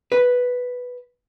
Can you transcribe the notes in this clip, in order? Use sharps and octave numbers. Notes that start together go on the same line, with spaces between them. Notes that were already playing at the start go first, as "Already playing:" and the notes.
B4